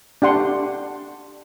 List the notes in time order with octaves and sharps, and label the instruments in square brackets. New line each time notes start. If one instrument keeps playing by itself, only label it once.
[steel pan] D4 G4 F#5 C6